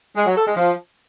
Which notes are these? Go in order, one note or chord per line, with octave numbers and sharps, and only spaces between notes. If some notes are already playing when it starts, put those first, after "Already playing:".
G#3
F#3
A4
G#3
F3